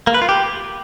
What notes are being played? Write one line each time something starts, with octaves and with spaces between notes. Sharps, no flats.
A#3
B4
F4
G4